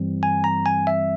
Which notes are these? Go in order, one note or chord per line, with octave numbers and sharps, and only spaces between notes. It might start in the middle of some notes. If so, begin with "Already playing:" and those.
Already playing: G2 E3 G3 C4
G#5
A#5
G#5
E5